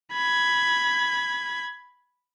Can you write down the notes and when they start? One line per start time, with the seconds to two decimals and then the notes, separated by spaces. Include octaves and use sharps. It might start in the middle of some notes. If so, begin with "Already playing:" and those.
0.13 B5 G#6